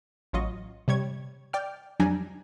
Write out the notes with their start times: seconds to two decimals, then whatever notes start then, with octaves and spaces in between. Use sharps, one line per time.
0.33 A1 F#3 F4 D#5 C#6
0.88 C3 G3 C#5 G#6
1.53 D5 G5 F6
2.00 F2 F#3 G3 D4 G#5 A#5